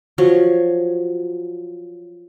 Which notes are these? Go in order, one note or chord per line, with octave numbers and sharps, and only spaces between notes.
F3 F#3 C#5